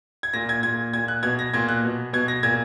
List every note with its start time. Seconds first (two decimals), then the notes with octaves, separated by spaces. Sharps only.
0.23 G#6
0.33 A#2 A#6
0.49 G#6
0.63 A#2 G#6
0.93 A#2 G#6
1.08 F#6
1.23 B2 G#6
1.39 A#6
1.53 A#2 G#6
1.69 F#6
1.83 B2
2.13 B2 G#6
2.28 A#6
2.43 A#2 G#6